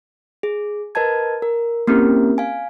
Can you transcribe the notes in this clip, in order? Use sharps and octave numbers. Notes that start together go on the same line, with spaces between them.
G#4
A#4 B4 D#5 A5 G#6
A#4
A#3 C4 C#4 E4 G4 A#4
F5 G#5